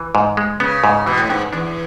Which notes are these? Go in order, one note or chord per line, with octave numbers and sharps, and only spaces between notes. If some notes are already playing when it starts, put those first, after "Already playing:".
Already playing: E3
G#2
G#3
C#3 B3
G#2
B2 E3
A2
G#2 B3
E2 D4